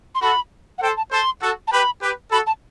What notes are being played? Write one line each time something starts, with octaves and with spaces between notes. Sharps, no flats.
C6
F#4 A4 B5
F#5
A4 C5 G5
A5
A4 C5 C6
F#4 A4
A5
G4 B4 B5
G4 B4
F#4 A4 B5
A5